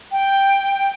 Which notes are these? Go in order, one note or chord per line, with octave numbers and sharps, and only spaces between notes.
G5